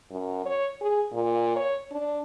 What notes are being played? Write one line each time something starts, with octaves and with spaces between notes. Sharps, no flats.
F#2
C#5
G#4
A#2
C#5
D4